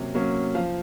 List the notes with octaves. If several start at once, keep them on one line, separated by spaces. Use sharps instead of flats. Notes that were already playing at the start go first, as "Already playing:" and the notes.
Already playing: C3 F#3 A#3 C#4
F#3 A#3 C#4
F3 F5